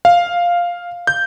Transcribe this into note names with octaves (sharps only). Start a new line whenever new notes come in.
F5
G6